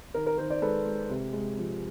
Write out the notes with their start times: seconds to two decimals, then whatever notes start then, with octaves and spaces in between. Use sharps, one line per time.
0.14 D#3 A#4
0.26 A#4
0.38 D#3 A#4 C5
0.50 C5 D5
0.62 G#3 A4 B4
0.86 G#3
1.10 C3
1.33 G#3
1.57 F3